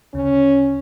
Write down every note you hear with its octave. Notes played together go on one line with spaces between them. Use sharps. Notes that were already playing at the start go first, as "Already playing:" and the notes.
D2 C#3 C#4